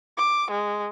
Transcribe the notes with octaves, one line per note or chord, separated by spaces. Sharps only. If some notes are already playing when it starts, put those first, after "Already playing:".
D6
G#3